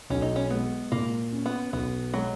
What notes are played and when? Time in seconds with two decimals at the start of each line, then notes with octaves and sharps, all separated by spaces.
0.10 B1 C#4
0.22 D#4
0.36 C#4
0.50 G#3 B3
0.92 A#2 A#3
1.32 C#4
1.46 B3
1.73 B1 B3
2.14 F#3 G#3